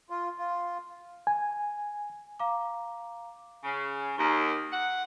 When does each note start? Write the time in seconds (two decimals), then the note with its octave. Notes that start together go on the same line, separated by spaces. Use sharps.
0.10 F4
0.38 F4
1.27 G#5
2.40 F5 A#5 D6
3.64 C#3
4.18 D#2
4.72 F#5